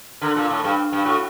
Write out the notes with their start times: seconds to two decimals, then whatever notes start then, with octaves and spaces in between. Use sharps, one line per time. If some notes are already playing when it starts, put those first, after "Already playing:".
0.21 D3 A#4
0.36 A#2 A4
0.50 A2 A4
0.64 G2
0.92 G2
1.05 A2 F#4